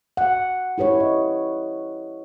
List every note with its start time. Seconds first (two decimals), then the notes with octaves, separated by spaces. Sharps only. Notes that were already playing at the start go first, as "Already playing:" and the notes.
0.17 F#5
0.78 E4 G4 B4 C#5
1.00 D#5